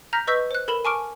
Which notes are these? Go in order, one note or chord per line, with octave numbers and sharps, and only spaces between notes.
A#5 F6 G6 A#6 B6
B4 D#5 C#6 E6 G6 B6
C5 F#6
A4 A#4 B5 E7 F#7
G#5 A5 C#6 D6 F6 D7